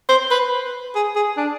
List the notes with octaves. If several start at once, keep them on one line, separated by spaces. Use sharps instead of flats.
C5
B4
G#4
G#4
D4